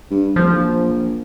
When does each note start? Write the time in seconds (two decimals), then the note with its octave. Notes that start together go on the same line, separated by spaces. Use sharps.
0.11 G2
0.36 D1 F3
0.52 A#1